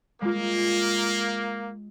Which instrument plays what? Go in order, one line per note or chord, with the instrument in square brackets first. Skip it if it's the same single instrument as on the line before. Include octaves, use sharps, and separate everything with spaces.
[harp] G#3 F4 [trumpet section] A#3